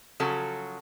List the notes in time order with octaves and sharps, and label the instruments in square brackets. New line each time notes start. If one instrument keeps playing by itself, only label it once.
[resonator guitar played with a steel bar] C#3 F3 F#3 F#4 A4